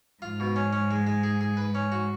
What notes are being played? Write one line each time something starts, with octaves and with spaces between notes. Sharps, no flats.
G#2 F4
B2
C#4
C#4
G#3
G#3
G#4
G#4
B4
C#4
F#4